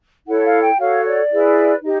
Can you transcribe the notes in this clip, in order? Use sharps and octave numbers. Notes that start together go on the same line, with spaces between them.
E4 A4 C#5 F#5
F5
G5
F#4 A4 C#5 F5
D5
E4 G#4 B4
D#4 G4 D#5